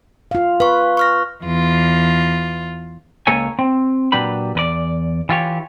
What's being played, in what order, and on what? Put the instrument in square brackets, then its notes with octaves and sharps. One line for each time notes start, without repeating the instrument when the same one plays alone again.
[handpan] F4 F5
[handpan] B4 [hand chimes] F5 C#6
[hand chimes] C#6 F6 A#6
[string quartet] E2 F4
[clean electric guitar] C#2 A#3 A4 C#5 G#5
C4
A#2 F#3 D4 G4 B4 B5
E2 B4 D5
E3 F4 G4 C#5